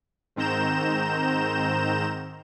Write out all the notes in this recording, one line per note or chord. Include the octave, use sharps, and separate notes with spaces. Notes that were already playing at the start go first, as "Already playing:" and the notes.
G#2 D#3 C4 A#5 G6 E7